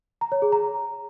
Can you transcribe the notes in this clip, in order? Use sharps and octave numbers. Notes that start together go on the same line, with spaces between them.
A#5
C#5
G#4
A#5